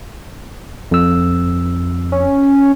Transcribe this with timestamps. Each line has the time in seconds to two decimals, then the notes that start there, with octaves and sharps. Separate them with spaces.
0.91 F2 E6
2.12 C#4